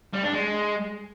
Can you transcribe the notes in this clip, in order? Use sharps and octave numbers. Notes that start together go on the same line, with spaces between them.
G3
D4
G#3